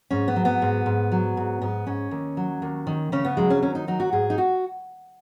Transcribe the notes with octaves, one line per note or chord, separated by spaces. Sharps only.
G#2 C#4
B3
F#3
B3
G#2
G#2
F#3
G#2
G#2 B3
G#2 C#4
D#2
F#3
D#2
D#3
C#3 C#4
B3
F#3 G#3
C#4
D#2 C#4
D#4
F#3 D#4
F#4
G#2 G#4
D#4
F#4